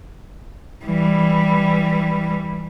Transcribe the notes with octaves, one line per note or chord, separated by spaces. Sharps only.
E3 G3